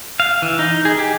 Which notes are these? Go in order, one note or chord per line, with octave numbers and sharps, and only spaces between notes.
F5
E3
D#4
G#4
G4